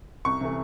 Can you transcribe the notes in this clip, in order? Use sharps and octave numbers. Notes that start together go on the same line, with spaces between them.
C2 C#6
C3 E3 A3